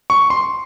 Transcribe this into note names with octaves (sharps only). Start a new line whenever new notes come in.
C#6
C6